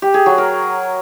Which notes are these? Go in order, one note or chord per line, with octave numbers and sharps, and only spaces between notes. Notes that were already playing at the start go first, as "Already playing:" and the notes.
G4
G#4
F#3
A#4